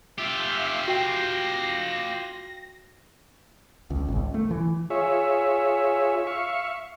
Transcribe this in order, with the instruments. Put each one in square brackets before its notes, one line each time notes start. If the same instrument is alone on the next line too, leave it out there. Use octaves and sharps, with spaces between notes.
[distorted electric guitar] F4 G4 [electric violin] E5 F5
[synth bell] F#4 G5 C7 [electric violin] A#6
[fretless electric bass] C#2
G#1 C#2
A3
E3
[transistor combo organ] F4 G#4 C#5 E5
E5 F5 C#6